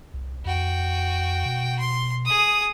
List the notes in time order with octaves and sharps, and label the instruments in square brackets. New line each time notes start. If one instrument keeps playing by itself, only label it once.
[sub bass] C2
[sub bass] F2 [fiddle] F#4 G5
[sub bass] B2
[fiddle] C6
G#4 D#6